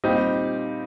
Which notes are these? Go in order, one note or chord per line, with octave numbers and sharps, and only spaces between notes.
A#2 G3 C4 D#4 G4